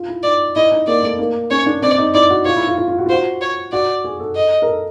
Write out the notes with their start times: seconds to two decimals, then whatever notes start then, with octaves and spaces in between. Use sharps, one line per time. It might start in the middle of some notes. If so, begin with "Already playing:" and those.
Already playing: F4
0.08 E4
0.23 D#4 D5
0.55 E4 D#5
0.72 D#4
0.87 A#3 D5
1.03 A3
1.19 A#3
1.50 C#4 C#5
1.66 D4
1.82 C4 D5
1.98 D#4
2.14 E4 D5
2.30 F#4
2.45 F4 C#5
2.56 E4
2.67 F4
2.77 F4
2.88 F4
2.98 F#4
3.06 F4
3.09 F#4 C5
3.41 C#5
3.73 F#4 D5
4.04 G#4
4.20 A4
4.35 D#5
4.62 A#4
4.68 A4